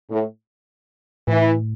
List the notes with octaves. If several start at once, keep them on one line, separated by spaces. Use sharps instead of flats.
A2
A2 E3